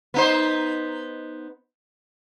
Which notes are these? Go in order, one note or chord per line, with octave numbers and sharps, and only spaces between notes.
B3 D#4 C5